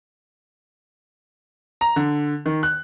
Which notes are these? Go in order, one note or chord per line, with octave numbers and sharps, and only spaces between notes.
A#5
D3
D#3
F#6